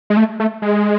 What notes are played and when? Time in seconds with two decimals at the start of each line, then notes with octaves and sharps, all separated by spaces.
0.10 G#3
0.17 A3
0.40 A3
0.62 G#3